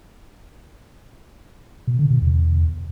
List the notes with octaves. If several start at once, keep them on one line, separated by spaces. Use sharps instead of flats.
B2
D3
B2
E2